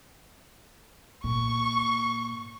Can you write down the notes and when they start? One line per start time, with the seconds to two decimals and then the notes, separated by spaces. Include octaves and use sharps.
1.24 A#2 C#6